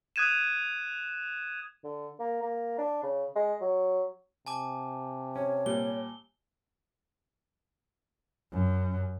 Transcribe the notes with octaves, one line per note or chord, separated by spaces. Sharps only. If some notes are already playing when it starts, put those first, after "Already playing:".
D#6 F#6 G#6 D#7 E7
D3
A#3
A#3
D4
C#3
G#3
F#3
C3 G#5 A5 D6
C#4 C#5
A#2 G3 G7
F#2